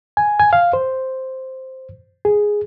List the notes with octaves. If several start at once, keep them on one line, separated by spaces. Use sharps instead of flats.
G#5
G#5
F5
C5
G#4